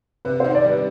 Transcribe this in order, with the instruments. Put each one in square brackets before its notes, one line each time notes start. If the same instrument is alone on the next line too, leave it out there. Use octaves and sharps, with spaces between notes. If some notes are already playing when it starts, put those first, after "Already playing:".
[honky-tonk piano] C3 [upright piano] B4
[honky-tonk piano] D#3 [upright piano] C5
[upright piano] D5
[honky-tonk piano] G3 [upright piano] B4